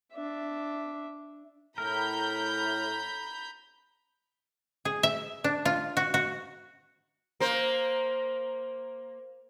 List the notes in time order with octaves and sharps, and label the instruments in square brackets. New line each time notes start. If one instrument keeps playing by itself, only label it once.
[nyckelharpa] D4 E5
[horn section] A2 [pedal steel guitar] A#4 [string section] A#5 B5 G6
[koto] G#4
E5
D4
F4
F#4
F#4
[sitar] A#3 C5